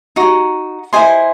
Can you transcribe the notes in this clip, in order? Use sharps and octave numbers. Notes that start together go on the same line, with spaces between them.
D#4 F#4
E4 C5 D#5 G#5 C6